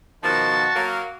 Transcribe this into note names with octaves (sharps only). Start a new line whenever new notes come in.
B2 D#3 F3 F#4 A5
F#3 A#3